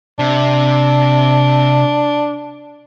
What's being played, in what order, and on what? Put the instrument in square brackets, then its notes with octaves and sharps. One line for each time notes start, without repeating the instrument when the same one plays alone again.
[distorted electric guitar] C3 [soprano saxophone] D4